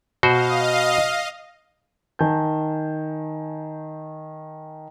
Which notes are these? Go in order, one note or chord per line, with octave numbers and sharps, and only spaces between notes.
B2 F#4 C5 D#5 F5
D#3 G#5 A5 G6